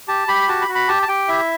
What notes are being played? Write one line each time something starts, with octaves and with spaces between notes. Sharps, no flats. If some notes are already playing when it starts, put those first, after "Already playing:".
G4 A5
G4 B5
F#4 A5
B5
F#4
B5
G4 A5
A5
G4 G5
E4 E5